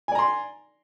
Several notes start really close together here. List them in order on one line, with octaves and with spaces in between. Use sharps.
G#5 D5 A#5 C6